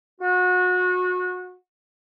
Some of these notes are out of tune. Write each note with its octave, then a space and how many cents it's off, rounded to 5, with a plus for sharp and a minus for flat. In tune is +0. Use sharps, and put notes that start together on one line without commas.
F#4 -30